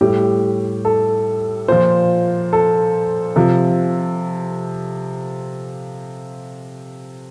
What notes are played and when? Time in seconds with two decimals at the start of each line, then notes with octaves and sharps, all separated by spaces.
0.01 A2 G3 G4
0.85 A4
1.68 A#2 F3 C5
2.53 A4
3.36 C3 F3